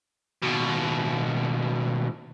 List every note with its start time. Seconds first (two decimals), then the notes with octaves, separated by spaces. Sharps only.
0.42 D#2 B2